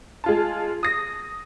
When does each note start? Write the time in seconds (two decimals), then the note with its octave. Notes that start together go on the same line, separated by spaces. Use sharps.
0.24 G#3 F4 A5
0.83 D#6 A#6